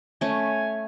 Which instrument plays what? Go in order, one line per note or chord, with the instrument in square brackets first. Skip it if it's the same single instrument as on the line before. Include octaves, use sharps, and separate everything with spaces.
[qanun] A3 C#4 [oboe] G#5